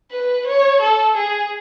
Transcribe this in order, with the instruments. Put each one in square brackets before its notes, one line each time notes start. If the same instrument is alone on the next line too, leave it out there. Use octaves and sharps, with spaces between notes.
[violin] B4
C#5
A4
G#4